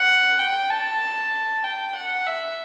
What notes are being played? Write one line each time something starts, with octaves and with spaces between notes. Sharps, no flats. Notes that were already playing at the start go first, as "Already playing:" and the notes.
Already playing: F#5
G5
A5
G5
F#5
E5